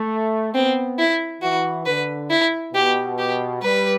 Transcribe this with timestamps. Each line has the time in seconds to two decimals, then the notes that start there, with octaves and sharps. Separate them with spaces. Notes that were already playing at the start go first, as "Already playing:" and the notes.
Already playing: A3
0.54 B3 C4
0.99 E4
1.42 E3 F#4
1.86 D3 B4
2.30 E4
2.74 B2 G4
3.18 G4
3.62 G3 B4